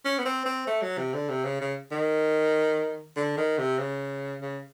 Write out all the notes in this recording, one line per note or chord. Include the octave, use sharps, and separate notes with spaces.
C#4
B3
C4
C4
A3
F#3
C3
D3
C3
C#3
C#3
D#3
D3
D#3
C3
C#3
C#3